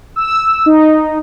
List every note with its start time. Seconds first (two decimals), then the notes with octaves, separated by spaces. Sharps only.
0.16 E6
0.66 D#4